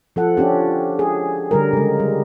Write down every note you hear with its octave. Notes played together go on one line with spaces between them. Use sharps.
F3 A4 F#5
C#4 D4 G4
G#4
D3 G3 A#4
C#3 G#3
G3